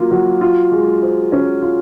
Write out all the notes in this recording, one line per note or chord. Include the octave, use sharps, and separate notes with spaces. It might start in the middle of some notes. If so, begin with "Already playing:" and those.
Already playing: F#3 A#3 F4
F#3
F4
G#3
C5
C#4
F4